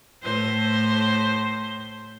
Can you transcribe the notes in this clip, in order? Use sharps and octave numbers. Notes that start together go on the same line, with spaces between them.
A2 C5